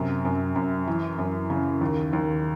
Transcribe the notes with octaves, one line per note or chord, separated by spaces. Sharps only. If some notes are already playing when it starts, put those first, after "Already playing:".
Already playing: F#2 C3
F#2
F#2
E3
F#2
C#3
D#2
D#2